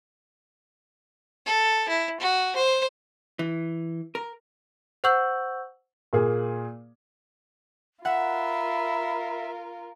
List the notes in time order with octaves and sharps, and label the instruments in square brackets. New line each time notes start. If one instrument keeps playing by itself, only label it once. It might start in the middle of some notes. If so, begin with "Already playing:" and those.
[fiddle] A4
E4
F#4
C5
[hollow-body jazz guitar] E3
A#4
[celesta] C5 F#5 C#6 E6 G6 F#7
[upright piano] A#2 A#3 G#4
[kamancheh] F4 A#4 [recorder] E5 [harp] F#5 [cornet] B5